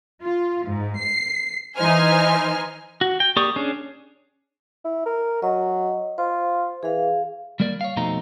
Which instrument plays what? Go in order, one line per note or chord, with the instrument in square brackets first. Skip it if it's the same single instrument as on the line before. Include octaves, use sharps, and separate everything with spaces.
[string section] F4
G#2
C7
E3 D#4 C5 G#5 F6
[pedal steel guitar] F#4
G5
A#3 G4 D5 C#6 D#6
C#4 D4 G#4
[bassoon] E4
A#4
[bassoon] F#3 [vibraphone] D#5
[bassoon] F4 [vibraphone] C5
[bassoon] E3 [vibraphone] G#4 F5
[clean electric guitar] G3 A#3 A#4 D5
C#5 F5
F2 B2 A3 C4 D#4 A#5